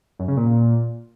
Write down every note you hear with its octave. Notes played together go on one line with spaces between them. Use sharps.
F#2
C#3
A#2